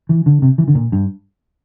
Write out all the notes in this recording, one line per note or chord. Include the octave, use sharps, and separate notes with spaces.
E3
D3
C3
E3
D3
A#2
G2